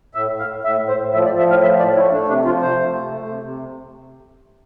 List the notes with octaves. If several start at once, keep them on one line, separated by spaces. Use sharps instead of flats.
A2 E5
A2
F5
A2
A2 E5
A2
C5
A2
F3 E5
D5
F3
E5
A2 F5
F3 E5
A2 D5
A3 E4
A3 D4
C3 D4
F3 F4
C3 C5
A3
C3
A3
C3
C3